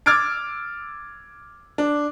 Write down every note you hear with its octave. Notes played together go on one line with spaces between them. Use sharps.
D6 E6 F6 G#6 A6 D7
D4